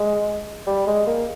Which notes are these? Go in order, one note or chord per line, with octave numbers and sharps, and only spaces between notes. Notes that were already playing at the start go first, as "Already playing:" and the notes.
Already playing: G#3
G3
G#3
A#3